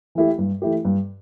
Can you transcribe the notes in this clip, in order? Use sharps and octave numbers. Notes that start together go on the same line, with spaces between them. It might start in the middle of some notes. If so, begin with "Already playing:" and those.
E3 A3 E4 G4
G2
E3 A3 E4 G4
G2